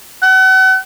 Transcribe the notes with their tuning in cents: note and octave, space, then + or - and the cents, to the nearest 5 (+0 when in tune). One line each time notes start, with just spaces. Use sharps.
F#5 +35